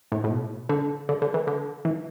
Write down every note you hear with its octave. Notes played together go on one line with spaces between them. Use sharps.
A2
A2
B2
D3
D3
D3
E3
D3
E3